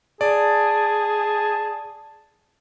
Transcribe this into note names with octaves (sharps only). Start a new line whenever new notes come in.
G#4 D5 A5